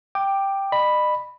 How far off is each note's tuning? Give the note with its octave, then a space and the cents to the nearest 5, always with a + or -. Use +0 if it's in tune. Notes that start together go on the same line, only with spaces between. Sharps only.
G5 +0 D6 +15
D#5 -45 B5 +0